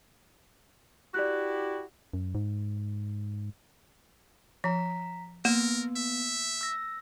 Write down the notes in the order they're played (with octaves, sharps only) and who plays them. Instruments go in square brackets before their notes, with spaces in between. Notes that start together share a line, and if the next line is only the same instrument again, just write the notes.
[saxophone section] E4 F#4 G4 [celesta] D5 F#6
[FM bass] F#2
G#2
[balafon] F3 [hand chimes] A#5 B6
[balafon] A#3 [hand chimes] B3 [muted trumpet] A#4
[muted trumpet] E5
[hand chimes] E6 A#6